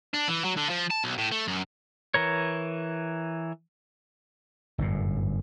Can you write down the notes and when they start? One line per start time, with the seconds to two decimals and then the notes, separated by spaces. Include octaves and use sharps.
0.14 D4
0.28 E3
0.45 F#3
0.57 D3
0.70 F3
0.91 A5
1.04 B1
1.18 A2
1.32 A3
1.48 F#2
2.14 E3 A#4 C#5
4.78 G1 F#2 A2